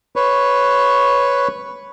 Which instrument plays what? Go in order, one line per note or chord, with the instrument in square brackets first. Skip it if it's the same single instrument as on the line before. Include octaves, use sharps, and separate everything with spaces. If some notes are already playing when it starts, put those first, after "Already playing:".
[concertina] B4 C#5